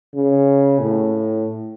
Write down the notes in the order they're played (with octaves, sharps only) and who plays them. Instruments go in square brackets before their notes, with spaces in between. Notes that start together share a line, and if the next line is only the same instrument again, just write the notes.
[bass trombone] C#3
A2